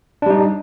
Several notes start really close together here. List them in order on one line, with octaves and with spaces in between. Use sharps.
D4 G3 D#4